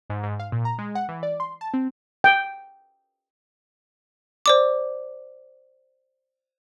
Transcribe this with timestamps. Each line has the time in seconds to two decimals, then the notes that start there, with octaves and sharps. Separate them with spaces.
0.10 G#2
0.23 G#2
0.40 F5
0.52 A#2
0.65 A#5
0.78 G#3
0.95 F#5
1.09 E3
1.23 D5
1.40 C6
1.61 A5
1.74 C4
2.24 G5
4.46 C5 D5 D6